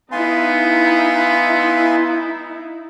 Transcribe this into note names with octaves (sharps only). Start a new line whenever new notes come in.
B3 D#4 E4 F5 G#5 C6